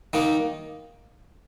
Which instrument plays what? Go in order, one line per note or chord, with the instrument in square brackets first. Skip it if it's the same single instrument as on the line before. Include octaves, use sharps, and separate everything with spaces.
[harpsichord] D#3 A#3 D#4